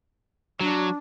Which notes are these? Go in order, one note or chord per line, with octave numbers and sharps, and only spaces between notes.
F#3 D4